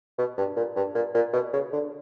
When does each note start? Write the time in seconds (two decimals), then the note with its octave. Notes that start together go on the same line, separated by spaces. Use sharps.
0.18 B2
0.38 G2
0.57 A#2
0.76 G2
0.95 A#2
1.15 A#2
1.33 B2
1.53 C#3
1.72 D3